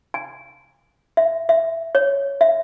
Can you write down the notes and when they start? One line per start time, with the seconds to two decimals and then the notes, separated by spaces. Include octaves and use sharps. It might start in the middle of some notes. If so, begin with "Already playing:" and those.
0.14 G#5
1.17 E5
1.49 E5
1.95 C#5
2.41 E5